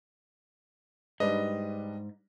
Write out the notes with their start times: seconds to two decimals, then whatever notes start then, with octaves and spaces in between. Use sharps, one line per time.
1.20 G#2 G3 D4 B4 D#5